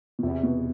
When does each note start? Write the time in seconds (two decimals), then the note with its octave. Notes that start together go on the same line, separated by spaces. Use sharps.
0.19 B2
0.23 E2 C3
0.43 B2